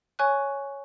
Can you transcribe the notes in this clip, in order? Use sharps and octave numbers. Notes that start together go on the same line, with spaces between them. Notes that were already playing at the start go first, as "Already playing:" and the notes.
C#5 G#5 C#6 F#6